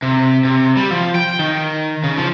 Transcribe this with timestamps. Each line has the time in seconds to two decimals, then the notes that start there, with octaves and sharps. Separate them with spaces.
0.02 C3
0.45 C3
0.77 G3
0.91 F3
1.15 G5
1.39 D#3
2.04 C#3
2.17 F3